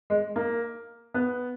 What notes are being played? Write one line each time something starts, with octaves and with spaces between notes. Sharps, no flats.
G#3
A#3
B3